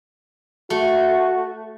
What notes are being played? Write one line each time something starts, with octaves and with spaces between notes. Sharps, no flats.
A3 F#4